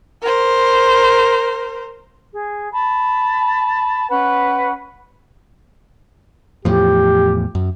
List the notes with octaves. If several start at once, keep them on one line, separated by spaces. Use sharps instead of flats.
A#4 C5
G#4
A5 B5
C#4 B4 F#5 B5
E2 A2 F3 G4
F#2